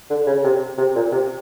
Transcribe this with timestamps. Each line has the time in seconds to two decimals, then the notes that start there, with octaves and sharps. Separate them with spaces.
0.10 D3
0.26 C#3
0.44 C3
0.78 C3
0.95 A#2
1.12 C3